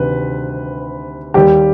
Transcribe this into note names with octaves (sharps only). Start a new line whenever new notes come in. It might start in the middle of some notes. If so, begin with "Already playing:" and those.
Already playing: D2 C3 D#3 G3 B4
D#2 D#3 G3 G4